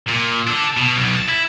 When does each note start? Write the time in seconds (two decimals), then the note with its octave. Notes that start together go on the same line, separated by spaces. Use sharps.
0.08 A#2
0.47 D4 A4
0.77 B2
0.96 B1 B2
1.16 A5
1.29 E4